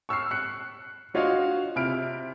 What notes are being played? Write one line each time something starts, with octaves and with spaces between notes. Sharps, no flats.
C#6 E6 F6 C7
F#6 C#7
D4 F4 F#4 C#5 D#5 F5
C3 E4 F6 D7